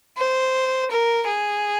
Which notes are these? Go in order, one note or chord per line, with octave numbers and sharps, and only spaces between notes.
C5
A#4
G#4